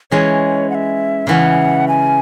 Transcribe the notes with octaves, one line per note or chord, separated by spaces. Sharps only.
E3 G#3 C#4 C#5
F#5
E5
C#3 E3 C#4 F#5
G#5